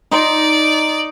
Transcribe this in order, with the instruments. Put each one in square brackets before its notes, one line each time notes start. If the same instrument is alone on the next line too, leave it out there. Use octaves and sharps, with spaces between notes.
[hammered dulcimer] D#4 C6 [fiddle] D5